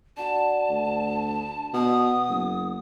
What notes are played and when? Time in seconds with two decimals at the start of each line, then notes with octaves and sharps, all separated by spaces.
0.17 D4 F#4 G#5 A5
0.69 D2
1.33 B5
1.74 B2 C#5 D#5 F#5 D#6
2.29 F#1 C#5